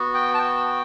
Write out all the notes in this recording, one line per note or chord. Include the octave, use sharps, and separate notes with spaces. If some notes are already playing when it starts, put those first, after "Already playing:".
Already playing: B3 F#4
G5
A5
G5